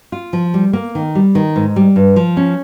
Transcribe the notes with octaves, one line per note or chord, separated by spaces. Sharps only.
F4
F3
G3
A#3
D#3
G3
D#3
G#2
G3
G2
F3
C#4